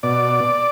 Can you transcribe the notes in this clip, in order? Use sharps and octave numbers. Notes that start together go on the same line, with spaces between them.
B2 D5